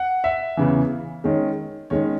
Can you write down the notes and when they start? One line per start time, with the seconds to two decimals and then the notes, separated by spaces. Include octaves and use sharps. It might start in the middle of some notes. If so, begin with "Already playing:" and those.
Already playing: F#5
0.24 E5
0.57 E2 C#3 E3
1.24 D#3 G#3 C#4
1.90 D#3 G#3 C#4 C#5